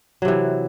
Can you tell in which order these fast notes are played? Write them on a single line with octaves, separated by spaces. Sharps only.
F#3 C3 E3